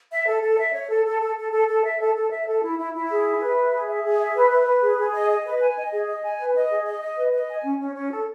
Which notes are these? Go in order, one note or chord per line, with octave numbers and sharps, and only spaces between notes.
E5
A4
A4
E5
C#5
A4
A4
A4
A4
A4
A4
E5
A4
A4
E5
A4
E4
E4
E4
G#4
E5
B4
E5
G#4
E5
G#4
E5
B4
B4
B4
G#4
G#4
D#5
D#5
B4
G#5
D#5
G#4
D#5
G#5
B4
D#5
G#4
D#5
D#5
B4
D#5
G#5
C#4
C#4
C#4
A4